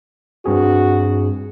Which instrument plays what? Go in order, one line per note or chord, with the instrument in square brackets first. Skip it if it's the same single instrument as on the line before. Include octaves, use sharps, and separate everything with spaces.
[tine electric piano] G2 C4 G#4 [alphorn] F#4